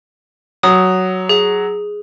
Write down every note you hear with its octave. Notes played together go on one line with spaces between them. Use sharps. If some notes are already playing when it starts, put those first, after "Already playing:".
F#3 D#6
G#4